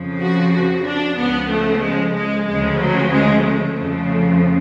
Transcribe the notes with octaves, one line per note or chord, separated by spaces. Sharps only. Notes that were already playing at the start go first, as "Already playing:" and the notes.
Already playing: F2 C#3 F3
F#4
F#4
D4
C#2 C#3 F3 B3
A3
G#3
G#3
D2 C#3 F3 G#3
F#3
G#3
A3
F2 C#3 F3